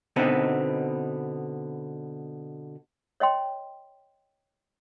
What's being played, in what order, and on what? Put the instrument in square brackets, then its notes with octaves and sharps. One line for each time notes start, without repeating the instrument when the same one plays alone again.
[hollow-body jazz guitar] B2 D3 B3 C4 D#4
[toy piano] C#5 D#5 G5 C6